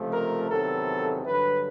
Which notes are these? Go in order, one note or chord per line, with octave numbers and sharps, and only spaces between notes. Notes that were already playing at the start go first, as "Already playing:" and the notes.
Already playing: C#2 C3 F3 A3
A#4
E2 C3 D#3 F#3 B3 A4
G2 D3 F#3 B4